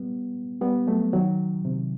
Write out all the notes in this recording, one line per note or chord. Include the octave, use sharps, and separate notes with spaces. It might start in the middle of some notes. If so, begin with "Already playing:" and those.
Already playing: G3 B3
G3 B3
F#3 A3
D#3 F#3
C3